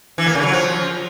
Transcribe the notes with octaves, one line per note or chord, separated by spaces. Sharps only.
E3
A#3
C#3
F#3
F3